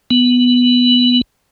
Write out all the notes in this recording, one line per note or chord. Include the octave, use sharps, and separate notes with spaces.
B3